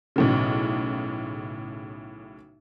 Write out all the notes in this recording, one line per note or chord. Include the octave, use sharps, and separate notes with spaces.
B1 A2 C#3